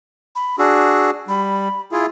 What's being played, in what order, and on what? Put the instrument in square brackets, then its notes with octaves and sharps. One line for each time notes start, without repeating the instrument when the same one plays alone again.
[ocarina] B5
[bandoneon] D4 F#4 G#4 [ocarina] E6
[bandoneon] G3 [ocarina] B5
[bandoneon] E4 F4 G#4 [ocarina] E5